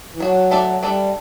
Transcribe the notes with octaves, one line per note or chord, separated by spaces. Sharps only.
E3
F#3 D4 F#4 C#5
A3 D4 A4 D5
G3 A3 D4 A4 D5